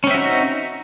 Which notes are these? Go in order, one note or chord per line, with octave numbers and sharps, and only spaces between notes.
C4 C#4 D#4 F#4 E5